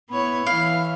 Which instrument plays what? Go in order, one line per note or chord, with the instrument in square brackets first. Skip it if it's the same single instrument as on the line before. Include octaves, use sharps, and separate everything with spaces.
[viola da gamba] B3 E4 C#5 [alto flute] B5
[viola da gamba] E3 [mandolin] F5